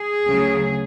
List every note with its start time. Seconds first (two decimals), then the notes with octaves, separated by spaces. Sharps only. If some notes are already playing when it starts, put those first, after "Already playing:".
Already playing: G#4
0.26 D2 C#3 F#3 A3